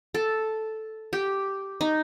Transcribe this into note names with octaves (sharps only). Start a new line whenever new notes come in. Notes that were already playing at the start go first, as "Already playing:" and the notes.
A4
G4
D#4